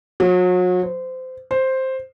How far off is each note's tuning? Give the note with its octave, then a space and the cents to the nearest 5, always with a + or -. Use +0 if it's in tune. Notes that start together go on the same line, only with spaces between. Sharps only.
F#3 -35
C5 -25
C5 +5